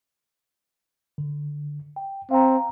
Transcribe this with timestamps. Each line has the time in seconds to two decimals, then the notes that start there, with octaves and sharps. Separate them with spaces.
1.18 D3
1.96 G5
2.31 C4 F5 A#5